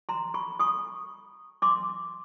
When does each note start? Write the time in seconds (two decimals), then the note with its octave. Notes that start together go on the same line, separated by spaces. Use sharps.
0.09 A#5 C6
0.34 B5 C#6
0.59 C#6 D#6
1.62 C6 D6